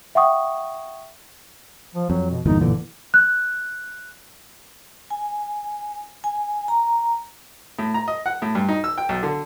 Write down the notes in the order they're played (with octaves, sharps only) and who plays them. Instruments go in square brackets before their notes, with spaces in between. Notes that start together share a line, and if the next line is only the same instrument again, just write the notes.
[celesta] E5 F#5 G5 C#6 D#6
[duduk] F3
[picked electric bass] F2 [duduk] F#3
[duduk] B2
[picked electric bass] G1 E2 A#2 [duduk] D#4
[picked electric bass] F#1 A#2 E3 [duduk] D3
[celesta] F#6
[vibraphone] G#5
G#5
A#5
[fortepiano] A2
A#5
D#5
F#5
A2
G2
D#4
E6
G5
B1
D3